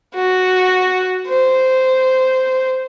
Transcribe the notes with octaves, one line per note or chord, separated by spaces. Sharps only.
F#4
C5